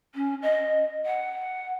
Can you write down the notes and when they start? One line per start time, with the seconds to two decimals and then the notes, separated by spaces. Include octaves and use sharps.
0.15 C#4
0.42 D#5
1.06 F#5